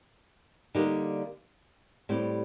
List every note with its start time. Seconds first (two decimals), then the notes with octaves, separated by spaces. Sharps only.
0.75 D3 G3 A#3 D#4 G4
2.09 A2 G3 C4 G4